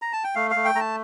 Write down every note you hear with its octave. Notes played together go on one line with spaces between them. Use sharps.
A#5
A5
G5
A3 F5
F5
A3
G5
A3 A5 A#5